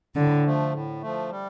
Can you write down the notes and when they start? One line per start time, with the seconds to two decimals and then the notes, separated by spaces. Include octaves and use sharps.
0.15 A2 D3
0.45 F3 A3
0.73 A2
1.02 F3 A3
1.31 G3